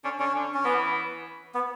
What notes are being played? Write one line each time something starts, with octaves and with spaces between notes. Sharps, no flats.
D3 C#4
D3 C#4
D3
C#4
E3 B3
B3